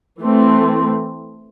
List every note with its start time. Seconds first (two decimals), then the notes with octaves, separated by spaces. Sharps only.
0.19 E3 A3 C4